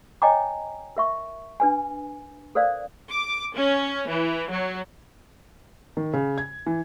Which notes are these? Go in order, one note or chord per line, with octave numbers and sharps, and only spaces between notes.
C#5 D#5 G5 G#5 A#5 D6
A#4 E5 C#6
D4 B4 G#5
A4 A#4 C5 D5 F5
D6
C#4
E3
F#3
D#3
C#3
G#6
E3